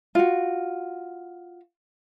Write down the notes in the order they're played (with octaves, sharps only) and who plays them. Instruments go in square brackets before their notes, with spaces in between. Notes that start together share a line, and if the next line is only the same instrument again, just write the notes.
[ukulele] F4 F#4